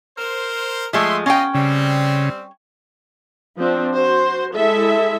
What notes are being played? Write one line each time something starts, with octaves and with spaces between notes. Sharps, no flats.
A#4 C5
F3 G#3 A3 E5 C6
C#4 F4 D#5 G5
C#3 G3 C4
F3 C4 D4
F#4 C5
G#3 E4 A4 E5